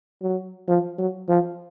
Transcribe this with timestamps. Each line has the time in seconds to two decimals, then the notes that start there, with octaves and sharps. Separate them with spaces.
0.22 F#3
0.68 F3
0.99 F#3
1.29 F3